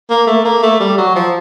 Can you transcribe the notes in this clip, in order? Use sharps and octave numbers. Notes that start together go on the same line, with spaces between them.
A#3
A3
A#3
A3
G3
F#3
F3